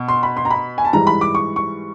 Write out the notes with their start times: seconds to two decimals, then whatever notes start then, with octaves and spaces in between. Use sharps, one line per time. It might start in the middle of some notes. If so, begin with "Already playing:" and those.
Already playing: B2
0.08 C6
0.23 B5
0.37 C6
0.45 A#5
0.51 B5
0.78 G#5
0.85 A5
0.93 G#2 E3 G3 A#5
1.07 B5
1.21 D6
1.35 C#6
1.56 C#6